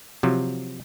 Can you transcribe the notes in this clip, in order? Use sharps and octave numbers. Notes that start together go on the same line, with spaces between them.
C3 F3 F#3